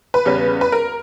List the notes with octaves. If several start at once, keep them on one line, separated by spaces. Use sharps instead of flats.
B4
E2 C#3 G3 C#4
B4
A#4